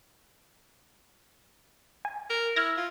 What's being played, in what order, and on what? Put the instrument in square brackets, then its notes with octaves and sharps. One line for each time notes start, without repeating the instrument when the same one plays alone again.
[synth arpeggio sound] G#5
[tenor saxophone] A#4
[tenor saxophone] E4 [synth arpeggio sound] F6 G#6 A#6
[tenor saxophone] F4